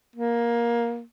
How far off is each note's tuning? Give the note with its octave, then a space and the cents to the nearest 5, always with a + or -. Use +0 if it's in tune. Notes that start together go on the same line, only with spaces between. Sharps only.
A#3 +15